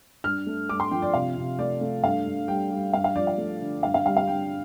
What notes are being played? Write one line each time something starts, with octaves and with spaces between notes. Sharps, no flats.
G2 F6
A3
G2 D6
C6
F3 G5
D5
C3 F5
C3
A3 D5
A3
G2 F5
G2
G3 G5
G3
G2 F5
F5
F3 D5
F5
A3
D3
G2 F5
F5
G3 F5
F5
G2 G5